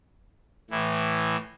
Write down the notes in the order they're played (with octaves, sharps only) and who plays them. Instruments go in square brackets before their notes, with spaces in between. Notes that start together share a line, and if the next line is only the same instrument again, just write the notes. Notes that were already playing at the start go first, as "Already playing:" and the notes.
[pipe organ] A2 E3